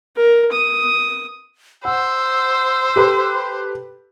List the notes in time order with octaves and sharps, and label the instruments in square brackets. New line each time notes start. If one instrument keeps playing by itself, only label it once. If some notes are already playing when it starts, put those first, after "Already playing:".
[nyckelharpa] A#4
D#6
[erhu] C5 [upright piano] F#5 [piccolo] E6
[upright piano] G4 A4 B4